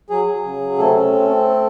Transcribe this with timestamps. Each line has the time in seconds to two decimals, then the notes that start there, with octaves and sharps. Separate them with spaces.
0.10 F#3 G#4
0.27 F#3
0.44 C#3
0.61 F#3
0.78 C3 A3 A4
0.95 C#4
1.12 C4
1.29 C4